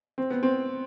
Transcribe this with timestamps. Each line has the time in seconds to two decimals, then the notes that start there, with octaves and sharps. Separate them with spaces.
0.18 C4
0.30 B3
0.43 C4